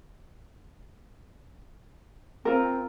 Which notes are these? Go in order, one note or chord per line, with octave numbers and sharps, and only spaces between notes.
C4 F4 A#4